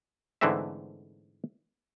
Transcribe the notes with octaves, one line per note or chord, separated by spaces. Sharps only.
G#2 D3 E3 A3 C4 E5